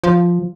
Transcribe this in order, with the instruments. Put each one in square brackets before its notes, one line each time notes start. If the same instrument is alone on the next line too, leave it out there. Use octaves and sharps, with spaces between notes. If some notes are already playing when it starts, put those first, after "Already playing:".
[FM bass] F3